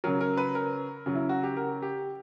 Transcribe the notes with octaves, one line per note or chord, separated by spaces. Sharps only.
C#3 F#3 A#4
A#4
B4
A#4
C#3 F#3
E4
F#4
G4
A#4
G4